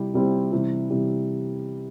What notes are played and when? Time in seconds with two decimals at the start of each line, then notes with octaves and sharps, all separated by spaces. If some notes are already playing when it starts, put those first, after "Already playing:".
Already playing: C3 G3 C4 E4 G4
0.14 C3 G3 C4 E4 G4
0.52 C3 E3 G3
0.90 C3 E3 G3